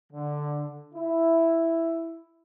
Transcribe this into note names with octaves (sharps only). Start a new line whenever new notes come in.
D3
E4